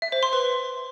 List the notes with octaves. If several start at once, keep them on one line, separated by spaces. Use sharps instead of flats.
E5
C5
C6
B4